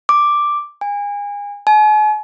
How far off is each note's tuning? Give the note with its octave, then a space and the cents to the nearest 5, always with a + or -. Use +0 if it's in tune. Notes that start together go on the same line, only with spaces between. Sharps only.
D6 +5
G#5 -30
G#5 +45